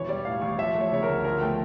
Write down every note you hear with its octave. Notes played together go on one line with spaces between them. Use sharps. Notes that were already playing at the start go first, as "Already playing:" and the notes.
Already playing: E1 E3 C#5
G3 D5
A2 F5
A1 C#6
F3 E5
A3
C#5
C#3 C#5
A#4
D2
F3 A#4
A3 G5